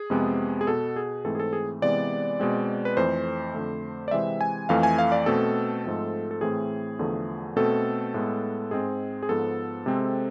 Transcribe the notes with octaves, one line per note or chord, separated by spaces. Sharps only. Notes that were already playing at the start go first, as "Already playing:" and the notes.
Already playing: G#4
F2 C3 G#3 B3
G#4
B2 B3 A4
G#4
G#2 E3 A3 C4 A4
G#4
A4
G#4
C3 E3 G#3 B3 D5
B2 G#3 C4
B4
F2 E3 A3 C5
F2 D3 A3
D5
C3 E3 G#3 C4 E5
G#5
F2 E3 A3 F5
G#5
F5
D5
B2 A3 C4 A4
G#2 F3 A3 C4
A4
A2 E3 A3 C4 G#4
E2 D3 F3 A3
B2 A3 C4 A4
A2 G#3 B3
G#2 G#3 C4 G#4
G#4
G#2 F3 B3 A4
C3 G#3 C4